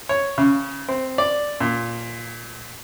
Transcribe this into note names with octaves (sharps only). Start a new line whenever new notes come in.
C#5
C#3
C4
D5
A#2